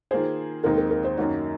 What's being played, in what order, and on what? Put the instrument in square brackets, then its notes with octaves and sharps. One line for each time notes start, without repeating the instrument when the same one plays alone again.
[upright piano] D#3 A#3 F4 G#4 [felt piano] C5
[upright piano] D#2 D#3 G#3 C4 D#4 [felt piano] A#4
[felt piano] A#4
A#4
C5
[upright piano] F#2 D#3 A#3 D#4 F#4 [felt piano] C#5